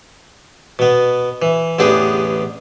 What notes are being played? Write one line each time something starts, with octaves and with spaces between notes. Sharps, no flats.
B2 B3
E3
A1 E2 D3 B3 G4 G#4